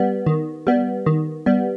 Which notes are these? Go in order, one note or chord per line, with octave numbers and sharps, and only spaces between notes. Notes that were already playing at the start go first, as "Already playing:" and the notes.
Already playing: G3 B3
D#3
G3 B3
D#3
G3 B3